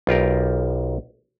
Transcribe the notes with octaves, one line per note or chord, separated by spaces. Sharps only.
B1 F4 G4 A#4